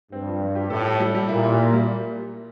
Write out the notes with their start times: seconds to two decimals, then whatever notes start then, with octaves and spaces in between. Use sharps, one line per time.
0.12 G2 C4
0.26 F3
0.42 F3
0.55 G4
0.70 A2 A4
0.85 A4
1.00 G3
1.15 G3
1.28 A#2 E4
1.43 E4
1.58 A#3
1.73 G3